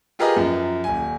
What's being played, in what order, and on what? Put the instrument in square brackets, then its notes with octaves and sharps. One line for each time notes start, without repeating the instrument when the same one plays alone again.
[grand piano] F4 G4 G#4 A#4 B4 D#5
F#2 F3
D#1 G#5